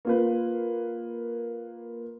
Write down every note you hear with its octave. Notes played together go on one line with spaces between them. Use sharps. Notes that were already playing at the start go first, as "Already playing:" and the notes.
A#3 F4 B4